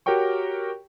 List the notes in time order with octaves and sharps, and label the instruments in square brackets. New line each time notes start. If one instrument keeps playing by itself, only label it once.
[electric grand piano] F#4 G4 A#4 C#5 G5 C#6